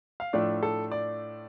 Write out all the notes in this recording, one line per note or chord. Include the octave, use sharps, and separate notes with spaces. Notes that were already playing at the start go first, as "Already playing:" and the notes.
F5
A2 F3 A3 D4 D5
A4
D5